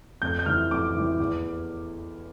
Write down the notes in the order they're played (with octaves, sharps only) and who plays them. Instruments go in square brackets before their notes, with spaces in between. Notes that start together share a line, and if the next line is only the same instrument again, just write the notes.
[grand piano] F2 G6
G6
E3 G3 F6
F2 D6
E3 G3
E2